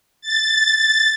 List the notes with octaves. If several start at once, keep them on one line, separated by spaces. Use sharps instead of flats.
A6